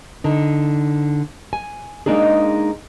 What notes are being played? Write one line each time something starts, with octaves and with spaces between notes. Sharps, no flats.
D3 D#4
G#5
G#3 A#3 D4 D#4 G#4